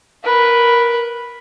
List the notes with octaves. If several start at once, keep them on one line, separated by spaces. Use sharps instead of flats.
A#4 B4